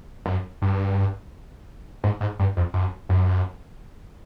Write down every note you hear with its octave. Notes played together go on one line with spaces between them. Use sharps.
F#2
G2
G#2
G#2
G2
F2
F#2
F#2